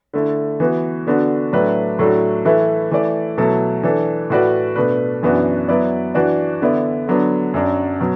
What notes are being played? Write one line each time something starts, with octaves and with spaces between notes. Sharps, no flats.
D3 A3 E4
E3 B3 F#4
D3 B3 D4 F#4
A2 F#3 A3 D4 B4
A2 F#3 A3 D4 F#4
E3 A3 E4 B4
E3 A3 E4 D5
B2 F#3 A3 E4 A4
E3 D4 A4
A2 A3 F#4 B4 D5
B2 A3 D4 B4
F#2 E3 B3 D4 F#4
F#3 B3 E4 B4 D5
E3 D4 F#4 D5
D3 B3 E4 D5
D3 F#3 B3 D4
F#2 F#3 D4
B2 F#3